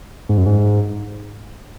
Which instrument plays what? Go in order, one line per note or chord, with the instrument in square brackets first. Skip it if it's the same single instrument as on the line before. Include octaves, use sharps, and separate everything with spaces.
[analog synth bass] G#2
F#2
G#2